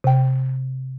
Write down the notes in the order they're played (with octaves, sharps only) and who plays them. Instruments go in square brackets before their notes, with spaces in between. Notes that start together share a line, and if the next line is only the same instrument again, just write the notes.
[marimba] C3 G5